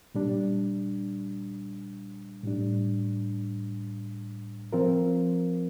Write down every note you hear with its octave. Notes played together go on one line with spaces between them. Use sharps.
A#2 G3 D4
A2 G3 D4
F3 C4 F4 A#4